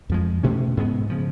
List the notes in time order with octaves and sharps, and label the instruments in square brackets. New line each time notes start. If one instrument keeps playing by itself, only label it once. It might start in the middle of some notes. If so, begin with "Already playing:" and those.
[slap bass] F2 F3 G#3
B2 A3 C#4
G#2 G#3 B3
C#3 F3